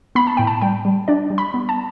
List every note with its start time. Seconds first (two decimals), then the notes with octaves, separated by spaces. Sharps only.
0.15 B3 B5
0.27 A5
0.37 A2 G5
0.47 A5
0.62 G3 G5
0.85 G3
1.08 D4 D5
1.30 G3
1.38 B5
1.54 B3
1.69 A5